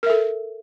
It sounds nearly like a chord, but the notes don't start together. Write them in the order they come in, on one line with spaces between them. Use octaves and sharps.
A#4 E5 A4